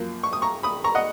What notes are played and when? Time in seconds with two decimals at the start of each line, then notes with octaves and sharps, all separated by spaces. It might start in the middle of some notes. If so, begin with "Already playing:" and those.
Already playing: F#2 F3 A#3
0.23 C#6
0.33 D#6
0.42 A#5 C#6
0.63 B5 D#6
0.84 A#5 C#6
0.95 D#5 F#5